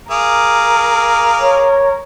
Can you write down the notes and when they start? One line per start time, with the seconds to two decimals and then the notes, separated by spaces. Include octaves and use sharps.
0.11 G#4 A#4 F5 D6
1.40 C#5